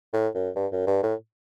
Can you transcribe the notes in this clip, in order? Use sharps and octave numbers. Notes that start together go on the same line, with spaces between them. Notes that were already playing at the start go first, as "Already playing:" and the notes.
A2
F#2
G2
F#2
G2
A2